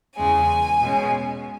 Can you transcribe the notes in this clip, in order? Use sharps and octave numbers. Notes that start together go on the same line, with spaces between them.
E2 C#3 G#3 G#5
B2 G#3 C#4